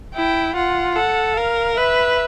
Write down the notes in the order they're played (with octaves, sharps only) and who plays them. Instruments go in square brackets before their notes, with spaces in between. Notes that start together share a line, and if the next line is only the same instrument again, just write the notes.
[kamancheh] E4 [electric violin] G5
[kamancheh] F4 [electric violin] F#5
[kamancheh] A4 [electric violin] F#5
[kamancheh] A#4 [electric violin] F5
[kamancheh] B4 [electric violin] E5